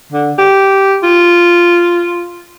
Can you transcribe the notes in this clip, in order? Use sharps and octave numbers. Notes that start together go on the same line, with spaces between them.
D3
G4
F4